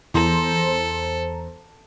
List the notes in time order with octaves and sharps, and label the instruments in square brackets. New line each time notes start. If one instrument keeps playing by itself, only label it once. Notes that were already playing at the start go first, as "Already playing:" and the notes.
[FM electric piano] E2 C5 A#5 [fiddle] A4